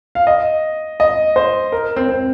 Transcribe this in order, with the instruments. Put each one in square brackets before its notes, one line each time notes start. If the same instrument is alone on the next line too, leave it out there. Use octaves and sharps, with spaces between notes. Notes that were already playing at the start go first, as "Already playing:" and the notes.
[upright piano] F5
D#5
D#5
C5
A#4
C4
C4